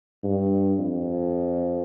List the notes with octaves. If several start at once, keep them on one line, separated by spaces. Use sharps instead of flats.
G2
F2